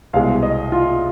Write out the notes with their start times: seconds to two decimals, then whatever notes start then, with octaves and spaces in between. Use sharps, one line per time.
0.13 C2 B2 G#3 F5
0.43 D#5
0.72 F4